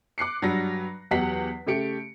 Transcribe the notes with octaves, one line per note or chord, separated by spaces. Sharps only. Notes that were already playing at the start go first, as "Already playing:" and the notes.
D6 F#6 C7 C#7
G2 F#3 G3 A#6
E2 F#3 G4 F#5 B6 C7
C#3 A3 G4 C#7 D7